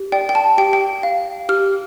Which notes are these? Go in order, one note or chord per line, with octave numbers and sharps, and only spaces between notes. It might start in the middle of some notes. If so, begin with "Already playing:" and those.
Already playing: G4
D5 G5
G5
A5
G4 G5
G5
F5
G4 F6